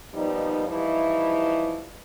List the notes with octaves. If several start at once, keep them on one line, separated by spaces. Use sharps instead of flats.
A#2 F3 G3 B3 D#4
E3 F3 G3 D#4 E4